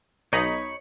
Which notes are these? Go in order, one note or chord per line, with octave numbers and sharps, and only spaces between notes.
B1 D#4 C#5 B5